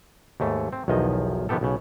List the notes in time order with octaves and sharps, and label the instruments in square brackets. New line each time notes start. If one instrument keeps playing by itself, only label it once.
[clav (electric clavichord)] D#2 G#2 A3
C4
B1 E2 D#3 F3 D#5
D#3 F3 B3 G4 A4
B1 C#3